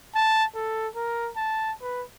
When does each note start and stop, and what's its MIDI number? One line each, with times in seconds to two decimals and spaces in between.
0.15 0.45 81
0.55 0.88 69
0.96 1.30 70
1.36 1.72 81
1.82 2.03 71